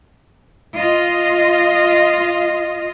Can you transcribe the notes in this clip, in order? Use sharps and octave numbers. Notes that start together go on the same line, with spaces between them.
F4 D#5